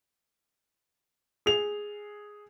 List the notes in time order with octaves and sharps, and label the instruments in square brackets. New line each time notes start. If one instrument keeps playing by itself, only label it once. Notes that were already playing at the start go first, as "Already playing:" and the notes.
[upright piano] G#4 F7